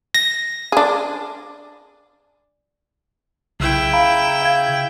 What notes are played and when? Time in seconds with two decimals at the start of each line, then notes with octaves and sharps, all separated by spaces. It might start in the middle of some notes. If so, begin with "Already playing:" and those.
0.14 A#6
0.72 D4 G#4
3.60 B1 C#3 E4 G5
3.93 F5 A#5 B5
4.42 F5 G#6